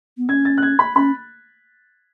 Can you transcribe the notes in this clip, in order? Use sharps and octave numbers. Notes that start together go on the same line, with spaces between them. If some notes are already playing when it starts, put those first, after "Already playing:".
B3
C#4 G#6
A6
F#6
G#6
B5
C#4 B5